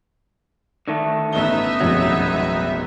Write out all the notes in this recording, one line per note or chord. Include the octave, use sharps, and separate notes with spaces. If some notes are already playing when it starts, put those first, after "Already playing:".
D3 D#3 A3
A1 B3 D#4 E5 G7
E1 A1 F2 F#3